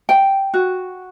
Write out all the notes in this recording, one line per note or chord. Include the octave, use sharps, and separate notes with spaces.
G5
F#4